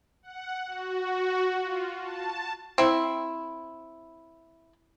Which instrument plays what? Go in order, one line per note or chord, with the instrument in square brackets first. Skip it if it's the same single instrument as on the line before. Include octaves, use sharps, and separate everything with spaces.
[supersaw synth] F#5
F#4
F4
A5
[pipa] C4 E4